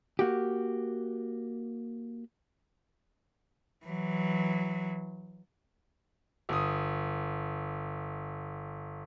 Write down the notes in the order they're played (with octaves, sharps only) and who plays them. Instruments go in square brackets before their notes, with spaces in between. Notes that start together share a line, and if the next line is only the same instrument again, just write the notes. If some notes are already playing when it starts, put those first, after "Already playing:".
[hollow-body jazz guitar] A#3 F#4 G4
[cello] E3 F#3
[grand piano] G1 D#6